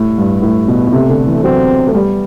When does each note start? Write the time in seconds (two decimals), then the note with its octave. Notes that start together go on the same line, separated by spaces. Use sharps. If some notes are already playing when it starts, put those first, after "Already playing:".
Already playing: A2 G3
0.18 G2
0.42 A2
0.68 B2
0.87 B2
0.93 C3 A3
1.10 D3
1.27 E3
1.43 F#3 C4
1.87 A3
1.94 G3 B3